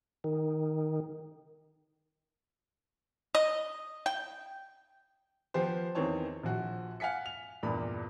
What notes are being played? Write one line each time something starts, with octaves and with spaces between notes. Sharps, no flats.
D#3
D#5
G5
F3 B3 G4 C5
E2 D#3 E3 C4 C#5 A5
A#1 F3 F#4
F5 F#5 G#5 B6 C#7
F7
E2 G2 A#2 G3 B5